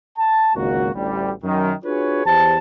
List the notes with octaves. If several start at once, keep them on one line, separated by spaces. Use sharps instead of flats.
A5
G#1 C#2 A#3 F#4
A1 D2 G3
F#2 D#3
D4 F4 F#4 G#4 B4 C#5
E2 G4 C5 A5